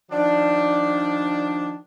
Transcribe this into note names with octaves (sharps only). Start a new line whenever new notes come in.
D#3 F3 D4